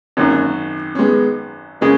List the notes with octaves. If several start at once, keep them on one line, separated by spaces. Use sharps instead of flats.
G#1 F#2 D#3 A#3 C#4
C#4
G#3 B3
C#3 G#3 A#3 C#4